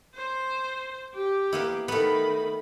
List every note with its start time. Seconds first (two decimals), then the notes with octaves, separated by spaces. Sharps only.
0.15 C5
1.15 G4
1.52 A#3 B3 E4
1.88 D#3 A3 B3 B5